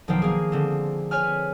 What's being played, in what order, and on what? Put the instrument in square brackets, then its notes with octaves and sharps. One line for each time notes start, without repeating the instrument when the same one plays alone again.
[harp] B1 D#3 F3 G5 C7
A#3 G#4
D3 C4
B4 C#5 G#5 F6